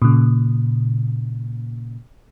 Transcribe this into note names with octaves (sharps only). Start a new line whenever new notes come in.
A#2 C#3